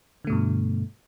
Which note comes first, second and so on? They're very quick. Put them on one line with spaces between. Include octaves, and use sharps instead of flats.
D3 A3 B2 G2